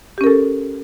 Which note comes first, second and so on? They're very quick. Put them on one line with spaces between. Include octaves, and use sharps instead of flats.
G4 C#4 A#4 A4